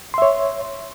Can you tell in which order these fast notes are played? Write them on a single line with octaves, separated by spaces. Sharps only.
C6 E5 C#5